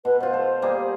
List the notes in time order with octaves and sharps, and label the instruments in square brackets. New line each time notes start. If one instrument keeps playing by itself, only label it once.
[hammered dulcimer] B2 [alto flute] B4
[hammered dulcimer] B2 F4 [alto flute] C5
[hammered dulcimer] A4
G3 A#3 G#4